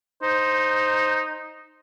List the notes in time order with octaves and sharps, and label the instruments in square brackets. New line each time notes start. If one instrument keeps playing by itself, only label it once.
[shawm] D#4 [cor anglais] C5